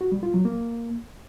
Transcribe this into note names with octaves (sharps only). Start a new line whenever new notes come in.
F#4
G3
F4
F#3
A#3